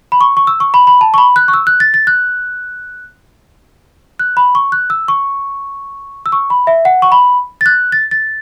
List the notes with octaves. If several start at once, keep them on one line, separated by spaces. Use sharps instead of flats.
B5
C#6
C#6
E6
C#6
B5
B5
A5
C#6
B5
F#6
C#6
E6
F#6
A6
A6
F#6
F#6
B5
C#6
F#6
E6
C#6
E6
C#6
B5
E5
F#5
C#6
B5
A6
F#6
A6
A6